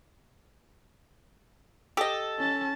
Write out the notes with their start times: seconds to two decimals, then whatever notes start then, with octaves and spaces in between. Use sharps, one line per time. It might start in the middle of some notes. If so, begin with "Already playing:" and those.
1.97 G4 A4 D#5
2.39 C#4 A5